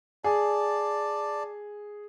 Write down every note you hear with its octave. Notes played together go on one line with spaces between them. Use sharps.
G#4 D5 A5